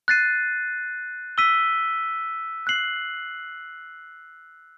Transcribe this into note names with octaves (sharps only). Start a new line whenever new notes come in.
F#6 A6 C7 D#7
E6 B6 D#7 G7
F#6 C7 F#7